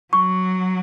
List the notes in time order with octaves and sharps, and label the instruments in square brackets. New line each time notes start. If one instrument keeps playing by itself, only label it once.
[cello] F#3 [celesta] C#6